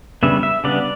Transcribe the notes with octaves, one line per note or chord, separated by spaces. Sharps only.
C#3 G3 B3 D4 E5
E5
C#3 G3 B3 D4 D5